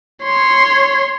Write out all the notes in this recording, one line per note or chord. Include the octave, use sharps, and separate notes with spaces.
C#5 C6